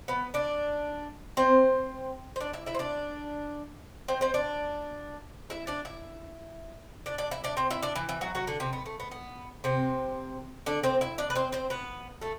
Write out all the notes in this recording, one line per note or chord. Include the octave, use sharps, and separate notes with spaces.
B3 B4
D4 D5
C4 C5
C5
D4 D5
E4 E5
E4 E5
C5
D4 D5
C4 C5
C4 C5
D4 D5
E4 E5
D4 D5
E4 E5
D4 D5
D4 D5
E4 E5
D4 D5
C4 C5
E4 E5
D4 D5
E3 E4
E3 E4
F#3 F#4
F#3 F#4
D3 D4
C3 C4
B3
A3
B3
B3
C3 C4
D3 D4
C4 C5
E4 E5
D4 D5
B4
C4 C5
C4 C5
B3 B4
A3 A4